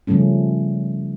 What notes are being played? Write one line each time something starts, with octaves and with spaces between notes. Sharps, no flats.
C#3 F3 G3 A3 C#4